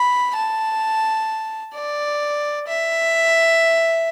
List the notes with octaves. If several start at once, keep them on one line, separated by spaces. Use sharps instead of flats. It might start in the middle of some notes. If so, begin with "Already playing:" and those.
Already playing: B5
A5
D5
E5